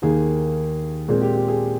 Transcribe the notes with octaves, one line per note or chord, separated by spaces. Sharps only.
D#2 D#3 A#3 G#4
A#2 G#3 C4 G#4
G4
G4
G#4